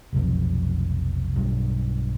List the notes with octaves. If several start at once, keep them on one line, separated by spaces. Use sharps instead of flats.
F1 B1 F2
B1 G2